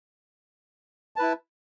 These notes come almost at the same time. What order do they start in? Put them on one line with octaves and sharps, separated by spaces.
A5 B4 E4